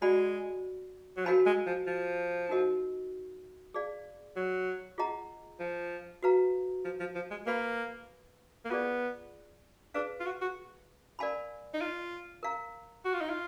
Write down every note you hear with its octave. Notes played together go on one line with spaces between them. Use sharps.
G#3 F#4 D5 F#5 B5
F#3
F3 F#4 A#4 F5 G#5 B5
G#3
F3
F3
D#4 F#4 A#4 D#5
G#4 D5 F5
F#3
F4 G#4 D#5 F#5 A#5
F3
F#4 B4 F5 A#5
F3
F3
F3
G#3
A#3 B4 F5 B5
A#3
B3 F4 G#4 D5
D4 G#4 B4 F5
F4
F#4
F#4
A#4 D5 F5 G#5 B5
D#4
F4
A#4 F5 A#5
F#4
F4
D#4
F4